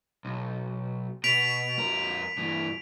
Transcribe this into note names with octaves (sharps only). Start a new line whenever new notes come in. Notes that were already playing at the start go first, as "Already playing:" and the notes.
B1
B2 B6 D7 F7
F2 A#4
G2 E3